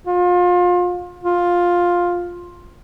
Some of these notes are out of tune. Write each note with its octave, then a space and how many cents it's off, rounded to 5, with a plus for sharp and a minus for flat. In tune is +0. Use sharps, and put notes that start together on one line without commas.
F4 +30
F4 +10